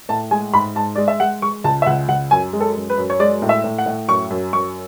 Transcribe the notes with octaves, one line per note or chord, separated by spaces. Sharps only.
A2 A5
G#3 G#5
G#2 B5
G#2 A5
G#3 D5
E5
G#3 F#5
G#3 C#6
C#2 A5
E5
C#2 F#5
C#2 F#5
F#2 G#5
G#3
A4
F#2
B4
F#2
C#5
G#3 D5
A2
E5
A2
F#5
A2
F#2 C#6
F#2
F#2 C#6